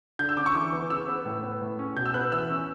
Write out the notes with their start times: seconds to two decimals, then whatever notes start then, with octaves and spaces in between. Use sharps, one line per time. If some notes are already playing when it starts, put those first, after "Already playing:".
0.19 D3 G6
0.29 E6
0.37 C#4 D6
0.46 C#6
0.55 E3 D6
0.72 B3
0.90 C#3 E6
1.08 B3
1.25 A2
1.43 B3
1.61 A2
1.79 C#4
1.96 B2 G6
2.06 E6
2.14 B3 F#6
2.32 E3 E6
2.49 C#4